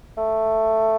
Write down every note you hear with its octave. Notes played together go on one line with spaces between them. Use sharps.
A3